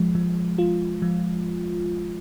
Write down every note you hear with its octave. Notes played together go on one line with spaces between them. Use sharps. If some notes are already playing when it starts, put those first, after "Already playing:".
Already playing: F3 G#3
F3
F4
F3